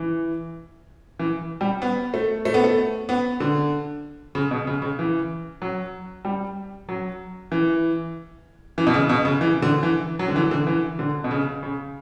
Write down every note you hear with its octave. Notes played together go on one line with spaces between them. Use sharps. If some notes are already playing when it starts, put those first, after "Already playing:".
Already playing: E3
E3
G3
B3
A3
A3
B3
A3
B3
D3
C#3
B2
C#3
C#3
E3
F#3
G3
F#3
E3
E3
B2
C#3
B2
C#3
E3
D3
E3
F#3
D3
E3
D3
E3
D3
B2
C#3
C#3